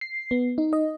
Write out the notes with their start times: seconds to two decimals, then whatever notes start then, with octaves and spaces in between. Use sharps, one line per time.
0.01 C7
0.31 B3
0.58 D#4
0.73 D#5